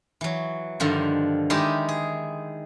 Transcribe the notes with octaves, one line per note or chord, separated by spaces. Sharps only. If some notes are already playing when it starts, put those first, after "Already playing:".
E3 F#3
G2 D3 D#3 F3
D#3 G#3 D#4 E4 G4
G#4